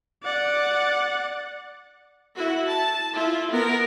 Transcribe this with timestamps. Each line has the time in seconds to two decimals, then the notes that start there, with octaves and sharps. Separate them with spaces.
0.24 D5 F#5
2.36 E4 F#4
2.67 A5
3.13 E4 F4
3.51 B3 A#4